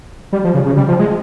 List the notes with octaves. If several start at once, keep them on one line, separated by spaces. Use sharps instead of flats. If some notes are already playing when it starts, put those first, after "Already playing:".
G3
F3
C#3
C#3
G3
F3
G#3